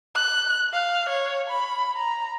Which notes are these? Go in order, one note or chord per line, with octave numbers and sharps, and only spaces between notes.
F#6
F5
C#5
B5
A#5